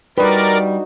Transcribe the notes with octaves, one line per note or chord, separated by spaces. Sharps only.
G3 D4 D#4 F#4 G4 A#4 B4 D5